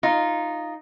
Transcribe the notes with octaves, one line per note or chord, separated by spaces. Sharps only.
D#4 F4